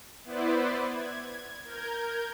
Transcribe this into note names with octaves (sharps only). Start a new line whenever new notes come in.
B3 E4 B4 C5 D5
G#6
A#4 G6 G#6